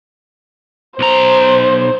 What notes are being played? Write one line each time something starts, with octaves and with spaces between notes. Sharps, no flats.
B1 C5 A#5